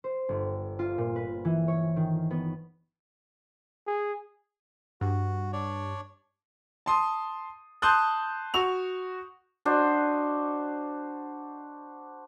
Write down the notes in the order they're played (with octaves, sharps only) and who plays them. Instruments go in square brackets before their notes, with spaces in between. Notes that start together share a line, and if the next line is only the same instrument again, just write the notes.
[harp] C5
G1
F4
A#2
B4
E3
C#5
D#3
B3
[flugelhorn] G#4
[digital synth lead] G2 [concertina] F#4
[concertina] D4 C#5 D5
[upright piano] A5 C6 D#6
A5 C6 D#6 F#6 G6
F#4 C#6 F7
[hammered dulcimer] D4 F#4 C5 D#5